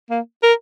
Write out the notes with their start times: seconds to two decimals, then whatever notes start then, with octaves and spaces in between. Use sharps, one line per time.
0.10 A#3
0.43 A#4